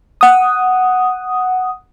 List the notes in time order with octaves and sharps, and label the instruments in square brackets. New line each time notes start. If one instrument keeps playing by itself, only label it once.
[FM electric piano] F#5 D#6